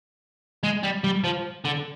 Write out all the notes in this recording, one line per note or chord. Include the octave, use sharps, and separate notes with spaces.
G#3
G3
G3
F3
D3